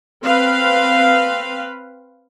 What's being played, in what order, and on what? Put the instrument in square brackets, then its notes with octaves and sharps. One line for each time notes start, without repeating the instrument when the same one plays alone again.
[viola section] C4 B4 F5